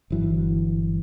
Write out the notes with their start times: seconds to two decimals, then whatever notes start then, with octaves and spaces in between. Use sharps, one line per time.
0.10 G1 E3 F#3